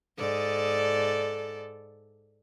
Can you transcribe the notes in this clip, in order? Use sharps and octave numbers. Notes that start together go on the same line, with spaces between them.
G#2 A4 D5